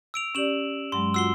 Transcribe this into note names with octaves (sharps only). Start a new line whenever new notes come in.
E6 D7 F7
C#4 G4 D5 E7 F#7
G2 F#3 G#3 C6
F4 F#4 F#5 E6 C7 G7